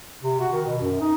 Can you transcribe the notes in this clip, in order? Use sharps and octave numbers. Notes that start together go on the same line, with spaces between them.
C3
F#4
D#3
B2
F#2
D#4